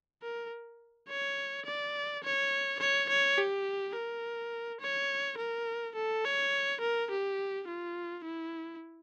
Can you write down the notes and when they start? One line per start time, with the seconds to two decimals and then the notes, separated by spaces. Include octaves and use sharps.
0.23 A#4
1.08 C#5
1.66 D5
2.23 C#5
2.80 C#5
3.09 C#5
3.38 G4
3.95 A#4
4.81 C#5
5.38 A#4
5.96 A4
6.24 C#5
6.81 A#4
7.10 G4
7.68 F4
8.25 E4